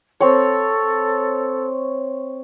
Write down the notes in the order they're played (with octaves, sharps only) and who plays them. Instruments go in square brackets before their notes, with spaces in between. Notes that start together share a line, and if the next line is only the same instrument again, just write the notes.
[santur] C4 C#5 [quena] A4